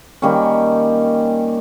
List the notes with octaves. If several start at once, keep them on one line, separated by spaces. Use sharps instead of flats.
D#3 G3 A#3 C#4